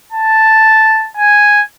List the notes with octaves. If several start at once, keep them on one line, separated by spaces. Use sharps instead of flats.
A5
G#5